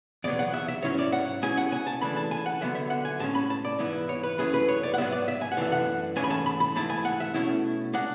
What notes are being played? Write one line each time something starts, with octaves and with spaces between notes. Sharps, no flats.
E2 B2 F#3 B3 D5
F#5
E5
E5
G#2 F#3 C#4 E4 C#5
D5
F#5
B2 G#3 C#4 E4 G#5
F#5
G#5
A5
C#3 E3 A3 D4 B5
A5
G#5
F#5
D3 F#3 B3 E5
E5
F#5
G#5
A2 G#3 C#4 A5
B5
A5
D5
G#2 E3 B3 E4
C#5
B4
F#2 E3 A3 C#4 E4 G#4
B4
C#5
D5
F#5
G#2 F#3 B3 E5
D5
E5
G#5
F#5
F#2 E3 A3 D4 E5
F#5
G#2 E3 A3 C#4 G#5
B5
A5
B5
B5
G#2 E3 A3 E4 A5
G#5
F#5
E5
B2 A3 C#4 E4
G#3 D4 F#5